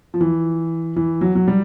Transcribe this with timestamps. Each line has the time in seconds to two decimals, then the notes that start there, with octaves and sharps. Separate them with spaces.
0.14 F3
0.21 E3
0.96 E3
1.21 F#3
1.35 F#3
1.48 G3